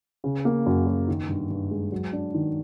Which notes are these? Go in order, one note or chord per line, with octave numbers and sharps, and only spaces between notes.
C#3
A#3
F#2
F#3
D#3
G2
G2
G#3
F#3
D4
D#3